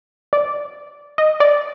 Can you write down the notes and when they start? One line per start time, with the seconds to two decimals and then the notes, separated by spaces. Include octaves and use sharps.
0.33 D5
1.18 D#5
1.40 D5